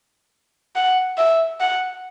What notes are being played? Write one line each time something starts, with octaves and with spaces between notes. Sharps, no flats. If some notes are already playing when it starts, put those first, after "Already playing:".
F#5
E5
F#5